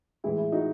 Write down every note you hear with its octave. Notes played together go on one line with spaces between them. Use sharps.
A2 E3 G#3 E4
E4
D#4 F#4